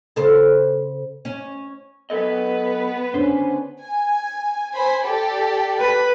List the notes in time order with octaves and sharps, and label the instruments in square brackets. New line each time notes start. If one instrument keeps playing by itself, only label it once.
[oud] C#3 A4 C5
C#4
[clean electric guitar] F#3 A4 D#5 [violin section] B3 B4
[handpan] C#4 D4 [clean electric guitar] C5
[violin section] G#5
C5 G#5 B5
G4 A4 D5
[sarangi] B4